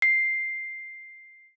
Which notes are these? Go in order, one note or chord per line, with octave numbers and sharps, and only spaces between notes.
C7